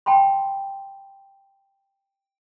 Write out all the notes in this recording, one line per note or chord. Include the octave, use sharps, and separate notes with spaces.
G5 A5 B5 C6